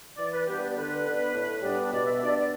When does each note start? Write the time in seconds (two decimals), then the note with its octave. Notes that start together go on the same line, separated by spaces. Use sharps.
0.17 E3 D5
0.32 B4
0.46 G3 B3 D4 G4
0.61 B4
0.69 D5
0.76 D3 B4
1.04 B3 D4
1.33 A2
1.62 G3 B3 D4
1.91 B2 D5
2.06 E5
2.20 B3 D4 D5
2.35 D5